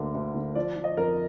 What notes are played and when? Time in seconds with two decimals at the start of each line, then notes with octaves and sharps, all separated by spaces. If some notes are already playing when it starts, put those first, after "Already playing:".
Already playing: D2 D3 A#3
0.15 D2
0.35 D3
0.55 F3 D5
0.76 F3
0.84 D#5
0.97 F2 A#4